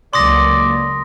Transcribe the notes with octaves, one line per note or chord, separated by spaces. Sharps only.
C#2 F#3 A#3 D5 C6 D#6 A#6